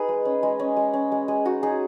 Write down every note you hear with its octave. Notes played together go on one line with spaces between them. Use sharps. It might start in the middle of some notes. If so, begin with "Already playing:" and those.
Already playing: D#4 G#4 B4
G#3
C#4
G#3
C#4
G#3
C#4
G#3
G#3 G#4
D#4 F#4
D#4 G#4